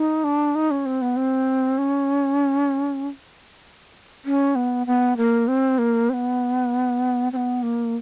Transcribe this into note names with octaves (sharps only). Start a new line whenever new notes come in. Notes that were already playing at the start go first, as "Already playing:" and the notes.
Already playing: D#4
D4
D#4
C#4
C4
B3
C4
C#4
C#4
B3
B3
A#3
C4
A#3
C4
B3
C4
B3
A#3